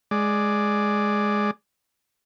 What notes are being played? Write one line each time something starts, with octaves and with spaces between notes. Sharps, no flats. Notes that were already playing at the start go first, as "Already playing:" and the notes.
G#3 D5